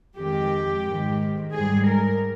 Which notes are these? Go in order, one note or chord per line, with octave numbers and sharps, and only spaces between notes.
F2 D#3 G#3 G4
G#2 D#3 G#3
G#2 G3 G#4
A#4